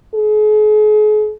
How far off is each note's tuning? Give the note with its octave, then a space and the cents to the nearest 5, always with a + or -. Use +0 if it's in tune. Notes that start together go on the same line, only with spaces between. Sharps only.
G#4 +40